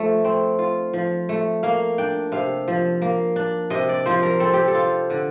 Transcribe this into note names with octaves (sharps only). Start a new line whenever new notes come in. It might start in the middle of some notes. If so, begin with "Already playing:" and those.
Already playing: F3 A3
C4
F4
F3
A3
A#3 F5
D4 G5
C3 F5
F3
A#3
D4
C3 D#5
D5
F3 C5
A#4
C4 A4
G4
A4
F4
D3